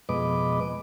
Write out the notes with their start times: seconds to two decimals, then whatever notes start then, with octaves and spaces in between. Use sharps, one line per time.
0.09 F2 B2 G#3 B4 D#5 D6